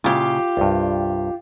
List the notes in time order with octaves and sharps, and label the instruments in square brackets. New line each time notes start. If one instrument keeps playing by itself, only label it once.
[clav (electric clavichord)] A#2 C#3 E4 [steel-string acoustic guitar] F4 G4
[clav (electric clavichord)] C2 G2